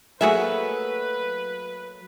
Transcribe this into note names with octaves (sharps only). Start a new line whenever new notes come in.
F#3 A3 A#3 F#4 G#4 B4 E5